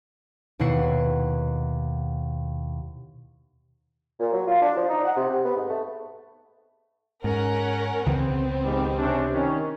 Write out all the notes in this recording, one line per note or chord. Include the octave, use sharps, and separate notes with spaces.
D#2 B2 E4 F#5 C7
A#2
F#3
F4
D4
F3
D#4
F#5
C3
C3
B3
G#2
A3
G#2 C#4 A#4 F#5
C#2 C#3 E3 B3 C4
G#2 D#3 G3
C3 C#4 D4
D#3 C#4